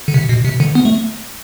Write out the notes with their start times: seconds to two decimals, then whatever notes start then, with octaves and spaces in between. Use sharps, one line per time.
0.08 D3
0.14 C3
0.29 B2
0.45 C3
0.60 D3
0.75 B3
0.85 A3